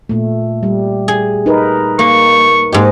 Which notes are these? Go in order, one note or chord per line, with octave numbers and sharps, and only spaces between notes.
A#2 A3
G3
G#4
D#4 A#4 B4
A#3 C#6
G#2 A#3 G4 D#5